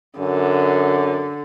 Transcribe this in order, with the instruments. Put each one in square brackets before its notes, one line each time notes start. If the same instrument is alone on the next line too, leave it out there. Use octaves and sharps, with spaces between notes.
[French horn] F#2 [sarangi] D3